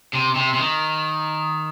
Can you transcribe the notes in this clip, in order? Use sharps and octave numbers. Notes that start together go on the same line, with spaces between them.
C3
C3
C3
D#3